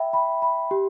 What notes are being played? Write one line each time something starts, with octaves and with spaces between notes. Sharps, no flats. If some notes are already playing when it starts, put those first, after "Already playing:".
Already playing: E5 G5 B5
B5
B5
G4